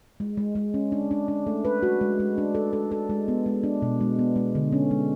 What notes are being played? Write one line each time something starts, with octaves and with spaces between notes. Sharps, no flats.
G#3
G#3
G#3
C#4
D4
D4
D4
A3
B4
F#4
G#3
G#3
D4
A4
A4
A4
G#3
B3
G#3
D4
B2
G#3
B3
G#3
D3
C#4
G#3